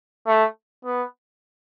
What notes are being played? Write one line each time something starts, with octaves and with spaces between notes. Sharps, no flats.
A3
B3